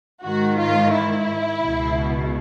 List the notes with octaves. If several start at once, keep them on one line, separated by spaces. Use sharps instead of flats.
G#2 D#3 F#4
F4
E4
C#2 B2